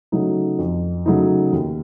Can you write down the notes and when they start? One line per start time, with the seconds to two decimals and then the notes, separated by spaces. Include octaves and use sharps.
0.12 C#3 F#3 A3 D#4
0.59 F2
1.06 C#3 F#3 A3 D#4
1.53 D#2